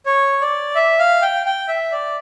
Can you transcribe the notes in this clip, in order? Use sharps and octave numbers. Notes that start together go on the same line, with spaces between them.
C#5
D5
E5
F5
G5
G5
E5
D5